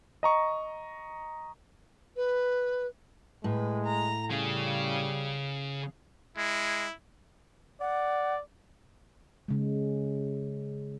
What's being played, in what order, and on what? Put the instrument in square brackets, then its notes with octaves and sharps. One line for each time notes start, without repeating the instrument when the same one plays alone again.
[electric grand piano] D#5 A#5 C#6
[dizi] B4
[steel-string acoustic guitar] A2 [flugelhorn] G#3 [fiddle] B4
[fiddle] A#5
[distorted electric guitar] C#3 [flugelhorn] G3 [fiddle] G#4 F5
[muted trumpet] G#3 [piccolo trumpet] E4
[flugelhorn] D5 [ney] F#5
[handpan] C#3 G#3